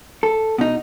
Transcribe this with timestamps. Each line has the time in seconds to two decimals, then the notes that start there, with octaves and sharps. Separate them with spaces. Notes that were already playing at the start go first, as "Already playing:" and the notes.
0.23 A4
0.58 B2 D#4